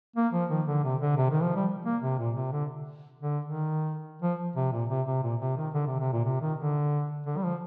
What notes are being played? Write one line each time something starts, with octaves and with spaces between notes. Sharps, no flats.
A#3
F3
D#3
D3
C3
D3
C3
D#3
F3
G3
A#3
C3
A#2
C3
D3
D3
D#3
F3
C3
A#2
C3
C3
A#2
C3
D#3
D3
C3
C3
A#2
C3
D#3
D3
D3
G3
F3